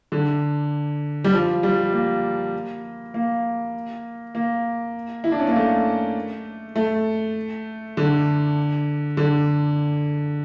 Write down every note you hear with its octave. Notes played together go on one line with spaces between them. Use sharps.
D3
G3
F3
G3
A#3
A#3
A#3
E4
D4
C#4
A#3
A3
A3
D3
D3